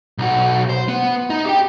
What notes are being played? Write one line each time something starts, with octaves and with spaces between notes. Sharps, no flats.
B1 F#4
C5
B3
D#4
G4 G5